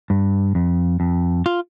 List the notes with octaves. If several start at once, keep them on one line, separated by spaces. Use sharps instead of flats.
G2
F2
F2
F4